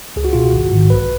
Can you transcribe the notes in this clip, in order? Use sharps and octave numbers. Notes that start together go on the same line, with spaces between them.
C#2 G#4
F#4
B2 F4
F#4
G#1
G#2 D#3
B1 B4